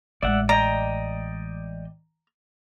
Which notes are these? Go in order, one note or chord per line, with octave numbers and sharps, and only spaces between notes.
A1 G#3 D5 E5 F#5
D5 D#5 G5 A#5